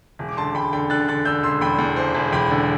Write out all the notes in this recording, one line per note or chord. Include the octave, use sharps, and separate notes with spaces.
E1
D6
D3 A5 C6
E1 G5 B5
D3 G5 B5
D3 F#6 A6
D3 F#6 A6
D3 E6 G6
E1 C6 E6
E2 G5 B5
E2
E1 C5
E1
E1 G5 B5
D3